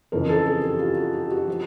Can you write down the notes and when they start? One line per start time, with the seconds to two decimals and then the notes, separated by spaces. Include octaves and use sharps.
0.12 F2 C#3 E3 A#4
0.29 A4
0.46 G#4
0.63 G4
0.79 F4
0.97 F#4
1.14 G4
1.31 F#4
1.47 F3